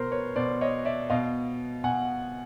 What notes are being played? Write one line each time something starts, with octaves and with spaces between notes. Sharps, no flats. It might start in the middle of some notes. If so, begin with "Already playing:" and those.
Already playing: B2 A#4 C5
B4 C#5
B2 C5 D5
C#5 D#5
D5 E5
B2 D#5 F5
B2 F#5 G#5